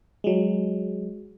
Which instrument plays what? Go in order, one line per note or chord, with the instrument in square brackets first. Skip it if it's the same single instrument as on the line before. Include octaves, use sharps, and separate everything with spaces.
[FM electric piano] F#3 G#3